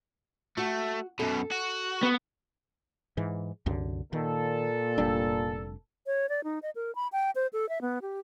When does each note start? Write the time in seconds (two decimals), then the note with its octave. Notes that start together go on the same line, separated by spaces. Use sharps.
0.58 A3 F#4
1.19 F#2 B2 A4
1.52 F#4
2.03 B3
3.17 G#2 E3
3.66 C2 F#2 D3
4.13 A#2 D#3 A4
4.98 F1 G3 D4
6.06 C#5
6.29 D5
6.44 D#4
6.62 D#5
6.76 A#4
6.95 B5
7.12 G5
7.35 C5
7.53 A4
7.69 E5
7.81 B3
8.02 G4